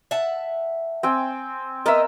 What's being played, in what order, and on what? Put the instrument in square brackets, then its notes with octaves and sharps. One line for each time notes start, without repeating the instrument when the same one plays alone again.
[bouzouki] E5 F#5 A5
[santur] C4 G5 G#5
[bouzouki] B3 D#5 [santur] A#4 E5